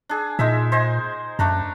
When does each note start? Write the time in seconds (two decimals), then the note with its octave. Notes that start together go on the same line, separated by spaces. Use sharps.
0.09 D4 G#4
0.39 A#2 G#3 D#4 E5
0.72 C5 D#5 G#5
1.39 F#2 A3 D4 A#5